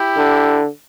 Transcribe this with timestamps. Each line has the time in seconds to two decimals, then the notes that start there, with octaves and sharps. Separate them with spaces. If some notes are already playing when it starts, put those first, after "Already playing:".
Already playing: E4 G4
0.17 D3